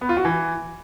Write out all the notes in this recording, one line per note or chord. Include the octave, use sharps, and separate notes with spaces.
B3
F4
F#4
E3